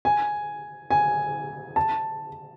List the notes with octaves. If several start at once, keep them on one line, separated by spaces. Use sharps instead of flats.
G#5
G#5
A5